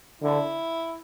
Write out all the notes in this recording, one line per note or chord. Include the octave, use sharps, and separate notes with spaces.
D3 E4